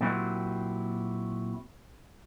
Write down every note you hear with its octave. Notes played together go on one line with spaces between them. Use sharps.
A#2 F#3 C4 E4 F#4 G4